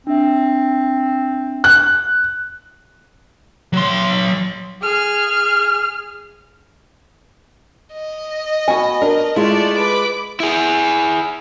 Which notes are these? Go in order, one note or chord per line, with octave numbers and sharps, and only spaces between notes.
C4 D4 E5
F#6
F#3 C6
G#4 F6
D#5
B3 F#4 G#5
D4 A#4
G#3 A3 E4 F4 D5
B4 D6
E4 G#4